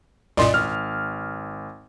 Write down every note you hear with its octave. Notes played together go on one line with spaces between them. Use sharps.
C2 F#2 A#2 D5 D#5 C6
G#1 F6